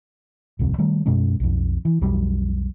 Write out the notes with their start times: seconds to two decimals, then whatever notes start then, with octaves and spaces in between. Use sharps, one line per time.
0.59 D1 C2 F2
0.78 D#3 G3 A3
1.06 F#2 B2 G#3 C#4
1.40 B1 F2
1.85 E3
2.01 B1 F2 F#3 G3